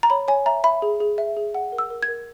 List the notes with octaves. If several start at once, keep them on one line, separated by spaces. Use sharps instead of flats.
A#5
C#5 B5
C#5 G#5
E5 A#5
E5 B5
G#4
G#4
E5
G#4
F#5
A#4
E6
A#4
G#6
A#4